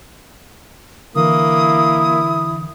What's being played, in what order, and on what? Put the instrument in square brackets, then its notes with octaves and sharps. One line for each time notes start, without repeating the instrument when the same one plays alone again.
[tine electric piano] D3 E3 [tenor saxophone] A#3 [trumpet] E4 [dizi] D#6